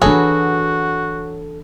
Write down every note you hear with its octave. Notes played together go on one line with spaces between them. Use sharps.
E3 F#3 D4 F#4 G#4 A4 B4